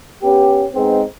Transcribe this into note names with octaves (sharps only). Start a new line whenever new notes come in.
B3 C#4 G4
G#2 G#3 B3 C4 D#4